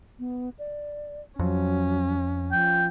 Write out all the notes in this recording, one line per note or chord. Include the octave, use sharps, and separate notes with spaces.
B3
D5
F2 F#3 C#4
F3 G5